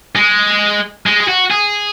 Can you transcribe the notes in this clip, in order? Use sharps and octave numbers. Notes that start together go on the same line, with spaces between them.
G#3
G#3
G#4
F#4
G#4